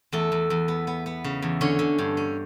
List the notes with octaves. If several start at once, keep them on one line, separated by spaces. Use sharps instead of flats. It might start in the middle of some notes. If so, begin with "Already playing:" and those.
E2 A3 A4
E2
E2
B3
B3
B3
C#3
E2
D3 C#4 C#5
D3
G2
C#4